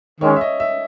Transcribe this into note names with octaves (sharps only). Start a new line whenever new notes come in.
D#3 G#3 C#4 C#5
E5
D#5
E5